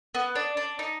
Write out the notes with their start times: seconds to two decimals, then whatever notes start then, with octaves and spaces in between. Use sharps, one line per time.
0.15 B3
0.36 D4
0.57 D4
0.79 D#4